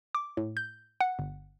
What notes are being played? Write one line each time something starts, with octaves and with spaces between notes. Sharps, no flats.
D6
A2
G6
F#5
G1